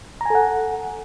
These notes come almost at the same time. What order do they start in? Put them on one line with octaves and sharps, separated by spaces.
A#5 G#5 A4 F#5